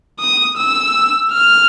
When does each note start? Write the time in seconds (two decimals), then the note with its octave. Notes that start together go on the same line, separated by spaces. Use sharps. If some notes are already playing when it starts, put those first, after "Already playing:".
0.20 D#6
0.57 E6
1.32 F6